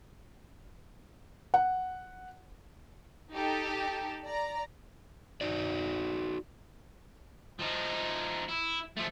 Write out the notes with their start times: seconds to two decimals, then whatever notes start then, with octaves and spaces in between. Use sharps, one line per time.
1.54 F#5
3.31 D#4 G4 A4
4.21 D5 A#5
5.41 D#4 F#4 D5
7.59 F3 D#4
8.49 E4
8.97 F3 A3